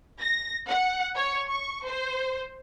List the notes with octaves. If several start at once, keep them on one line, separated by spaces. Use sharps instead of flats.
A#6
F#5
C#5
C#6
C5